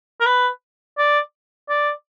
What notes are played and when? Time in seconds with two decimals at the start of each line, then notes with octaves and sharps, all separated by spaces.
0.20 A#4
0.26 B4
0.98 D5
1.69 D5